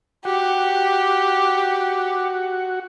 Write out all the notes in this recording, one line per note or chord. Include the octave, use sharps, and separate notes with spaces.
F#4 G4 F#5